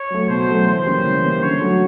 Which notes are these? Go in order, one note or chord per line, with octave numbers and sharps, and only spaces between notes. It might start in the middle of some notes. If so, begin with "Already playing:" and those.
Already playing: C#5
F#3 A3
B2 C5
F#3 A3
E3 C5
G3 A#3 C#4
E3
G3 A#3 C#4
D3 C#5
F#3 A3 C#4 F#4